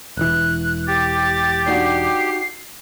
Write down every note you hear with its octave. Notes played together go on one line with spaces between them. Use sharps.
E1 E3 F#6
G4 A6
D4 D#4 F#4 C7